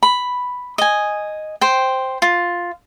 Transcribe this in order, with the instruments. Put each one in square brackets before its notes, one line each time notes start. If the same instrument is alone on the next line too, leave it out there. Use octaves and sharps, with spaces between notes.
[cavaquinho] B5
D#5 G#5
C5 G5
F4